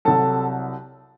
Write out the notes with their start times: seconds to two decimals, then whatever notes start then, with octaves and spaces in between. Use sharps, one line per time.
0.05 C2 C3 F#3 A4 A5